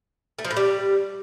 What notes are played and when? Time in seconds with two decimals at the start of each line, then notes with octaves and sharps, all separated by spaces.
0.39 A3
0.45 F3
0.51 A2
0.57 G3